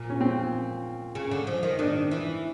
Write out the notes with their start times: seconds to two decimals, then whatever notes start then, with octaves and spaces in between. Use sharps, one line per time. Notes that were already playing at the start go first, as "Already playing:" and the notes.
Already playing: A#2
0.10 C#4
0.21 C4
1.15 C#3
1.31 D3
1.47 F3
1.63 D#3
1.79 D#3 D4
2.11 E3